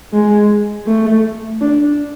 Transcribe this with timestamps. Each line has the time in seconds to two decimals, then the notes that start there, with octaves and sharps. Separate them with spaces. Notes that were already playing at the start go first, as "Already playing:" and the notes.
0.13 G#3
0.87 A3
1.61 D4